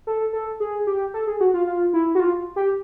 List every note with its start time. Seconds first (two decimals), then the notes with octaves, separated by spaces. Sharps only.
0.07 A4
0.33 A4
0.60 G#4
0.87 G4
1.14 A4
1.27 G#4
1.40 F#4
1.54 F4
1.67 F4
1.93 E4
2.15 F#4
2.20 F4
2.56 G4